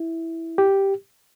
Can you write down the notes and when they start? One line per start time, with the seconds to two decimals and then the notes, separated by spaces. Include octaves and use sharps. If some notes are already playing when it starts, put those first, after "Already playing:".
Already playing: E4
0.58 G4